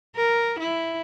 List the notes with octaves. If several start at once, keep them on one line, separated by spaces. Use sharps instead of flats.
A#4
E4